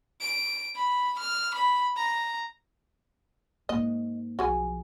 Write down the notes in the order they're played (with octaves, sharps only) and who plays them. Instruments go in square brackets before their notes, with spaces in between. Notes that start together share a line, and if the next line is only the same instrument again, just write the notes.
[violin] D7
B5
F6
B5
A#5
[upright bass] G#2 A#3 [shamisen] D#5
[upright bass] B1 F3 [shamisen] F#4 G#4 G#5